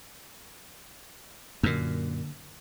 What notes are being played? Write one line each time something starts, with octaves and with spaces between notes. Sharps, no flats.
F#2 A#2 D3 A#3